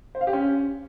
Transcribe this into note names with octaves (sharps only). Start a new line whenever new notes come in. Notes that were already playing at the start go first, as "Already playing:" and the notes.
C5
F5
G4
C#4